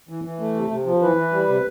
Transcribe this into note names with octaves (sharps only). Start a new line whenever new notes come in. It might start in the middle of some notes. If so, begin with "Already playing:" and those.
E3
E3
A3
C3
C3
F3
E3 B4
E3
G3
C3